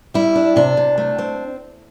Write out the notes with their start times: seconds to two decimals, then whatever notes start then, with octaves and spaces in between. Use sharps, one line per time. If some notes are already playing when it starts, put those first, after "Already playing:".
0.14 G3 E4
0.35 D4
0.56 C3 D4
0.77 C3
0.98 A3
1.18 C4